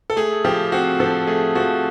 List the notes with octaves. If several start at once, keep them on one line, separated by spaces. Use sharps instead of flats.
A4
A3 G#4
F3 G4
C4 F#4
F3 A4
A3 G#4
F3 F#4